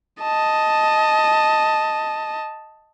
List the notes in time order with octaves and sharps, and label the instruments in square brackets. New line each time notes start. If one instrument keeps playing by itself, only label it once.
[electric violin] D#5 A5